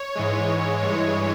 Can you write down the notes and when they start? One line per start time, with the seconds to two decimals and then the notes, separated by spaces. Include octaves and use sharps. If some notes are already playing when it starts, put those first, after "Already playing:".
Already playing: C#5
0.15 G#2 E3 G#3
0.82 G2 E3 G#3 C#5